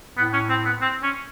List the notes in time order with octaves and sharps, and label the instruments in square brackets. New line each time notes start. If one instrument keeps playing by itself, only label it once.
[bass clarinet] A2 [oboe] B3
[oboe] C#4
C4
B3
C4
C#4